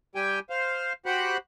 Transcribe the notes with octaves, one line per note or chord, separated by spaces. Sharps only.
G3 G4 G5 G#5
C5 F5
F#4 G4 C5 F#5 B5 F#6